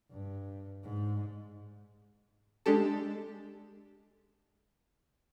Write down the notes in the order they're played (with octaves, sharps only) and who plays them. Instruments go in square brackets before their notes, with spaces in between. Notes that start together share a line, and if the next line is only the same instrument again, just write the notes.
[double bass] G2
G#2
[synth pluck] G#3 D4 G4 A4